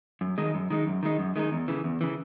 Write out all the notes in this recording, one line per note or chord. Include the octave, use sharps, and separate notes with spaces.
F#2
D#3 G#3 D#4
F#2
D#3 G#3 D#4
F#2
D#3 G#3 D#4
F#2
D#3 G#3 D#4
E2
C#3 E3
E2
C#3 E3